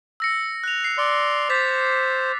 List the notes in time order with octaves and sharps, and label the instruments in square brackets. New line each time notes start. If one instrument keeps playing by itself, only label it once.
[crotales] E6 A#6 C#7
F#6 F7
C7
[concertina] D5 C6
[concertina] C5 [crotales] D6 A6 B6